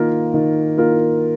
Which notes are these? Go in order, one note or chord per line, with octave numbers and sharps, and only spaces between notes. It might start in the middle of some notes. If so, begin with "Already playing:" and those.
Already playing: D#3 A#3 F4 A#4
D#3
A#3 F4 A#4